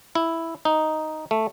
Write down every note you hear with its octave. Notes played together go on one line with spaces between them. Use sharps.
E4
D#4
A3